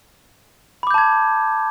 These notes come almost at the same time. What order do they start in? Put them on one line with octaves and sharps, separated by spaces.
B5 D6 G6 A5 G#6